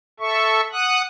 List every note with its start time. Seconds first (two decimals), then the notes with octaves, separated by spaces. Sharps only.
0.20 A4 E5 C#6
0.73 F#5 D#6 F#6